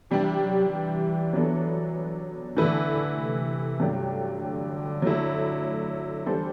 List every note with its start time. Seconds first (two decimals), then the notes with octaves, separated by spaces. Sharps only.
0.11 C3 E3 G3 D4 G4
0.42 F#3
0.72 E3
1.33 F#3 B3 D4 A4
2.57 D3 E3 A3 E4 B4
3.18 C3
3.80 G2 F#3 A3 D4 G4
4.41 D3
5.02 F#3 A3 E4
6.26 E3 G3 D4 A4 C5